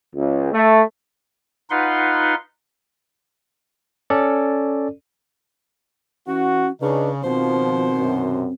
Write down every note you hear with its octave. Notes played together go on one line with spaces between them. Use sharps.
C#2
A3
D#4 F4 B4 F#5 C6
C#4 A4 D5
E3 C#4 F#4
C#3 D4 D#4 B4
B2 D#3 F3 C4 C5
F#2 C3